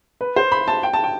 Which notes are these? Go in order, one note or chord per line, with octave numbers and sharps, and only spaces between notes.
B4
C5
B5
A5
G5
A5
G5